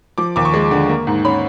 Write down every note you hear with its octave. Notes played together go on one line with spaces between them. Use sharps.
F3 D6
D#2 D6
C#6
G#3
D3
A#3
G#2
C#4 B5